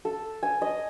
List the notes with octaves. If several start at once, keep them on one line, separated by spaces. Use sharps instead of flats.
A4
G#5
D#5